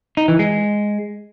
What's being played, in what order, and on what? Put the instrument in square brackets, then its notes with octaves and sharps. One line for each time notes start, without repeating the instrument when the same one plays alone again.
[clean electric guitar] D#4
E3
G#3